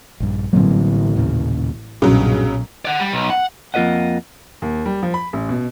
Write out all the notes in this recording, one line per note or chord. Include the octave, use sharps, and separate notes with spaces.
A#1 G2
A1 D3 F#3 G3 A#3 C4
D#2 A#2 C#3
B1 G2 A#2 C#3 F#3
D5 F#5
G3
B1
F#5
F2 A#3 F4 B4 D#5 F#5
D#2
G3
F3
B5
A1
B2